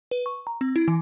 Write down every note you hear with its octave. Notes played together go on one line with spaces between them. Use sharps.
B4
C#6
A#5
C4
E4
E3